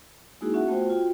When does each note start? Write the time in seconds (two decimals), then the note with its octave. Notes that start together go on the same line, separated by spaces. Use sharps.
0.41 G#3 A#3 D#4 E4 F#4 G#4
0.54 C#4 F#4 E5 F#5
0.68 A3 B3 F4 F#4 C5 G5
0.90 F4 F#4 G5